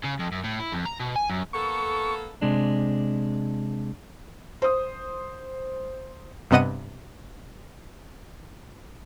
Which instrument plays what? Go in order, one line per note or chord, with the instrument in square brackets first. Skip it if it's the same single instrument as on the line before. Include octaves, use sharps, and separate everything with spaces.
[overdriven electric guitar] C#3
F2
F#2
A2
E4
F2
A#5
B2
G#5
F#2
[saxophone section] A#3 B3 A4 [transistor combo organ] C#6
[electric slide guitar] C3 G#3 D4
[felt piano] C5 D#6
[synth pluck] G2 C3 B3 D#5 F#5 D#7